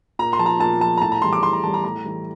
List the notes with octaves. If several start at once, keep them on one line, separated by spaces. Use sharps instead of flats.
A#2 A#5
C6
F3 A5
A#5
A#2 A5
F3 A5
A#5
A2 A5
A#5
E3 G3 C6
D6
A2 C6
A#5
E3 G3 A5
A#5
A2 A#5
E3 G3